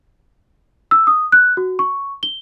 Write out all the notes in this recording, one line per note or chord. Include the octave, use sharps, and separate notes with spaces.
E6
D#6
F#6
F#4
C#6
G7